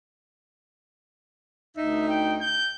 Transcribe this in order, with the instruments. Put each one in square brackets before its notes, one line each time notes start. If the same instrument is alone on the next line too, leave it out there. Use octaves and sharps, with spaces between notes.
[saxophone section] D2 D#4 [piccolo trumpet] E5
[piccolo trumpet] G5
G6